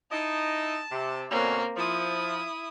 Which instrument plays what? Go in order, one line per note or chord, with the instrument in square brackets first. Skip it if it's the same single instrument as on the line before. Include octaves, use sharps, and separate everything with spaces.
[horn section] D#4 E4 D#5 [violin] A5
[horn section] C3
[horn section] B2 D3 C#4 [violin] A#3 C4
[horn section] F3 [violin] E4 D#6